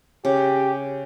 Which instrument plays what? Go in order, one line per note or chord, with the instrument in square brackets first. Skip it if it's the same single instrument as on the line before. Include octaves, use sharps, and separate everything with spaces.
[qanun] C#3 [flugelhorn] G4